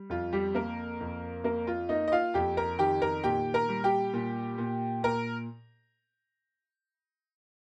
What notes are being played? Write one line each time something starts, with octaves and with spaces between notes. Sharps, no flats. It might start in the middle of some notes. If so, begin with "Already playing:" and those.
Already playing: G3
F2 F4
G3 G4
A#3 A#4
F2
A#3 A#4
F4
A#3 D#4 D#5
D#5
F4 F5
F2 G4 G5
A#4 A#5
D#3 G4 G5
A#4 A#5
A#2 G4 G5
A#4 A#5
G3
G4 G5
A#2
A#2
A#2 A#4 A#5